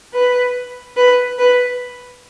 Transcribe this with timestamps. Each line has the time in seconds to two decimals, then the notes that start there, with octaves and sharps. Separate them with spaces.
0.14 B4
0.97 B4
1.39 B4